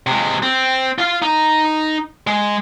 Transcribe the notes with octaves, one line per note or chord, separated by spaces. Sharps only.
C3 G#3
C4
F4 F5
D#4
G#3